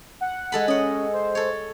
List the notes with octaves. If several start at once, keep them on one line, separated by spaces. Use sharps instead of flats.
F#5
G#3 A4 B5
C#4 D#5 F#5
C5
A4 C#5